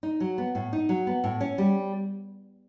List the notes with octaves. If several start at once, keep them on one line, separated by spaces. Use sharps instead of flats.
D#4
F#3
B3
A2
D#4
F#3
B3
A2
C#4
G3